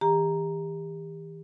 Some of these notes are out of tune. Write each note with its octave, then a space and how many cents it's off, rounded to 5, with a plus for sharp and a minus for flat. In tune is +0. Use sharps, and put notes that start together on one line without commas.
E3 -40 G4 +35 A#5 +0